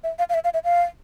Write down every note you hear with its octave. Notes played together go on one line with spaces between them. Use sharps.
E5
F5
F5
E5
F5
E5
F5